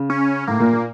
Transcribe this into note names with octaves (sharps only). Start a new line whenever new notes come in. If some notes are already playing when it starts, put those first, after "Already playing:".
Already playing: C#3
C#4
A2 A#3
A#2
A#2